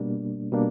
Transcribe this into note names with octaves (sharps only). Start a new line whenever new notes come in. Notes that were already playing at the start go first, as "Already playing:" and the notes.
Already playing: B2 G3 A#3 D4
B2 G3 A#3 D4